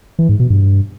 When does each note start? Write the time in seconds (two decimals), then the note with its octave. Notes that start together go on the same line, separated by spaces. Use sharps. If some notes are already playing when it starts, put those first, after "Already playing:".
0.19 E3
0.29 G#2
0.40 B2
0.50 G2